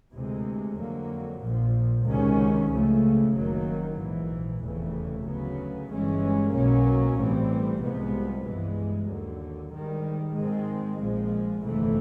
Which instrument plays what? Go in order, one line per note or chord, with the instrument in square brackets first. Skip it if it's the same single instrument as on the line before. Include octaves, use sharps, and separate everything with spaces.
[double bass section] D2 C3 E3 G#3
F2 D3 F#3 A#3
A#1 A#2 F3
C#2 C3 D#3 G#3 C#4
C#2 C#3 F3 A3
F#1 F#2 D#3 F#3 A#3
A#1 G#2 E3
F1 E2 C#3 E3 A3
D2 C#3 F#3 B3
G1 G2 E3 G#3 C#4
B1 B2 F#3 A#3 C#4
A1 A2 E3 G3 C4
C2 C3 F3 G#3 B3
G2 E3 G#3
D#2 D3 F#3
G#2 D#3 G3
G#2 D#3 G#3 C4
A#1 A#2 F3 G#3
G1 F2 C3 E3 A3